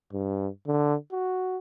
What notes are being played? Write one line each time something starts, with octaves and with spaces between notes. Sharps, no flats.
G2
D3
F#4